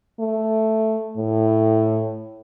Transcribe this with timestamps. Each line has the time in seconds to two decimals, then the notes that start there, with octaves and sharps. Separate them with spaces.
0.19 A3
1.17 A2